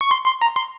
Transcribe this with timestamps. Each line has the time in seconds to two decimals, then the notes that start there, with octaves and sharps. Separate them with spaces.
0.01 C#6
0.11 C6
0.26 C6
0.42 A#5
0.56 C6